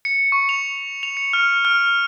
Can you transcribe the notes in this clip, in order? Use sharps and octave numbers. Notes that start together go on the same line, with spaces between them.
C#7
C#6
F7
F7
C#7
F6
F6